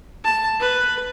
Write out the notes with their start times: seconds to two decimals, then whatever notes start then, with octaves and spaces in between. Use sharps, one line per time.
0.24 A5
0.60 B4